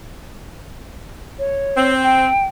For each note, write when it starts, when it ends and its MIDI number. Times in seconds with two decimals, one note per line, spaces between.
1.39 1.93 73
1.77 2.27 60
2.03 2.45 79